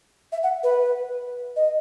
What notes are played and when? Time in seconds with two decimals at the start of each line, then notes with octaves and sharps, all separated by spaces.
0.32 E5
0.43 F#5
0.63 B4
1.56 D#5